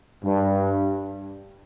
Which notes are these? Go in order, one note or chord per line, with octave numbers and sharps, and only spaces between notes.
G2